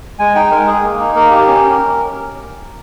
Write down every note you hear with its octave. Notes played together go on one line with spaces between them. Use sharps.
G#3 G#5
D#4 G5
G#3 A#4
G#4
A#3
D#4
A#3 A#4
G4
C#4